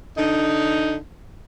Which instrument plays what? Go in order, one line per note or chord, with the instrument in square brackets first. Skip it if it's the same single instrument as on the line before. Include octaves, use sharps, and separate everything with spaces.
[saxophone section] D3 D#4